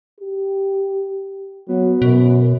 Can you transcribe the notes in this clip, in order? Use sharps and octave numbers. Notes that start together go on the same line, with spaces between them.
G4
F#3 B3
F#2 B2